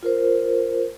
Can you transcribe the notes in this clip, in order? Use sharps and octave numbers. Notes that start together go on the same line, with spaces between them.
F4 A#4 C5